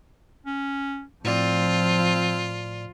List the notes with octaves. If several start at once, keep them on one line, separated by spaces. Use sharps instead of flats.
C#4
A2 F3 C4 F4 D5